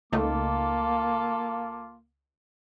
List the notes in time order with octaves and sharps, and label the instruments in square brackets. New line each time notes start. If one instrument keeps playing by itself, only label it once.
[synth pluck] C#2 A3 D#4 [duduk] A#3 [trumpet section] F4 A4 D6